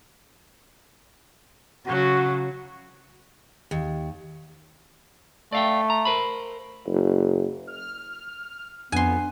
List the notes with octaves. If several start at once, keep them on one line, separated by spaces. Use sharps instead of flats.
C#3 F#3 F#4
D#2
A3 D5 F5 G5
A#5
A#4 C5 B5
F#1
F6
F2 B3 D4 G#5 C6